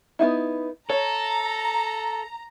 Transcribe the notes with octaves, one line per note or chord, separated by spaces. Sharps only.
B3 D#4 E4
A4 C#5 A#5